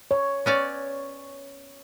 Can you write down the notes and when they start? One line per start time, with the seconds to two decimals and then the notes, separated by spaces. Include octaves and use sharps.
0.11 C#5
0.46 B3 C#4 D5